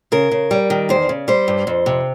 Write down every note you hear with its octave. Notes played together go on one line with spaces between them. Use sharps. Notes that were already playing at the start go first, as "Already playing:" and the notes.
C#3 A#4
C#3
G3
D#3
E2 C5
C#3
G3 C5
G2
F2
C3